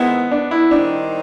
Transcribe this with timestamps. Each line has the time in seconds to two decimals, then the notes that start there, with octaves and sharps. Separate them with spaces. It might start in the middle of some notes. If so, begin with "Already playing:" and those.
Already playing: D#3 G#3 B3 C4 E4
0.31 D4
0.51 E4
0.71 D#3 G3 C4 D4 D#4